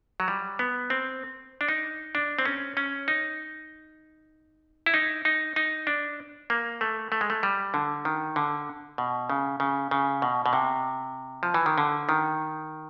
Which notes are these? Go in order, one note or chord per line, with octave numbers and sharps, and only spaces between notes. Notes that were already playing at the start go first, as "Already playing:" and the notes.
F#3
G3
B3
C4
D4
D#4
D4
C4
C#4
C#4
D#4
E4
D#4
D#4
D#4
D4
A#3
A3
A3
G#3
A3
G3
D3
D#3
D3
B2
C#3
C#3
C#3
B2
B2
C3
F3
E3
D#3
D3
D#3